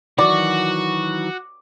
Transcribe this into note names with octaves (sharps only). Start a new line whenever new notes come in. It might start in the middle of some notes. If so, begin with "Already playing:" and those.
D#3 E3 F#3 F#4 D5 D6